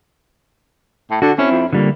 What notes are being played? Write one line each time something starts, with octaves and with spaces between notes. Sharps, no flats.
A2
D3 F#4
C4 C#4 E4
F2
F2 D3 G3 A#3